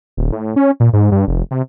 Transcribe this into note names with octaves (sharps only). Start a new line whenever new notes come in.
D#1
A2
C#4
A#2
G#2
G2
F1
C3